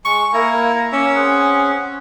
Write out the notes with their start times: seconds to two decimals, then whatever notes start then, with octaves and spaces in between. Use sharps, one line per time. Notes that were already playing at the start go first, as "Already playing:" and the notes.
0.05 G#3 C#6
0.33 A#3 E4 A#5
0.93 A#3 C#4 E6
1.15 C4 G#4 F#5